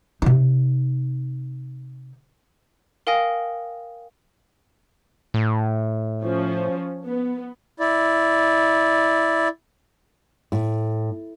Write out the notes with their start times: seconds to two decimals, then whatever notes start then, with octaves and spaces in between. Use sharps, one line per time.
0.22 C3 D#4
3.07 A#4 F5 G5 G#5 D#6 A#6
5.34 A2
6.24 F3 C#4
7.06 B3
7.80 E4 D5
10.52 A2